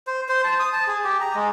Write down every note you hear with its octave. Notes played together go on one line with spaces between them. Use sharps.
C5
C5
A5
D#6
A5
G#4
G4
A#5
G#3